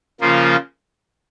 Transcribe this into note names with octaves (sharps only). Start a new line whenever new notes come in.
C#3 F3 A#3 F4